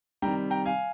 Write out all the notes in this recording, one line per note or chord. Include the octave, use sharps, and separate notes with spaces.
C3 D#3 G3 G5 A#5
G5 A#5
F5 G#5